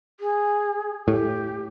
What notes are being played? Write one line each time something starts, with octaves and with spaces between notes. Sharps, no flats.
G#4
A2 G4